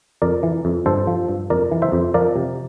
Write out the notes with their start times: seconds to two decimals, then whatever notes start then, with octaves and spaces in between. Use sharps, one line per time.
0.22 F2 A#4 D5
0.43 E3
0.65 F2
0.86 G2 A4 C5
1.07 F3
1.28 G2
1.50 F2 A#4 D5
1.71 E3
1.82 C5 E5
1.92 F2
2.14 F3 A#4 D5
2.36 C3